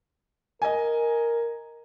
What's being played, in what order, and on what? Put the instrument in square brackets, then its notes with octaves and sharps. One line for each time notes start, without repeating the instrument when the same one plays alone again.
[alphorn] A#4 [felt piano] D#5 G#5